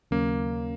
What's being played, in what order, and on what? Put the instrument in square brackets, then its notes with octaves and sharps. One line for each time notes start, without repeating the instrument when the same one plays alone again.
[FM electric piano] D#2 C#3 F#3 C#4 [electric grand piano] A#3